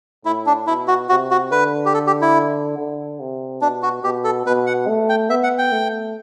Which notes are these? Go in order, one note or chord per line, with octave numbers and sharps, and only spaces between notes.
A2 E4
D4
B2 E4
F#4
C3 F#4
F#4
D3 B4
G4
A4
G4
E4
D3
C3
B2 D4
F#4
B2 G4
A4
B2 B4
F#5
A3
G5
B3 E5
F#5
G5
A3